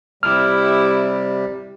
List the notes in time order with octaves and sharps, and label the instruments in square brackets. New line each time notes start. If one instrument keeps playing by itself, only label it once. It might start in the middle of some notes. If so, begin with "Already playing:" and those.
[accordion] C3 G3 [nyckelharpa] E4 G4 [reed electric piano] F6